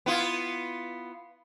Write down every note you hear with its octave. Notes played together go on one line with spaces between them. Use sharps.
B3 E4 F4